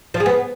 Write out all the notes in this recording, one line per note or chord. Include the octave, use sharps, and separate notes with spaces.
F3
G#4
B3